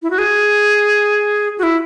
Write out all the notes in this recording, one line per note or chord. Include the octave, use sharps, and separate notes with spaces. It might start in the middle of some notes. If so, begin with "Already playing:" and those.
E4
F#4
G#4
F#4
E4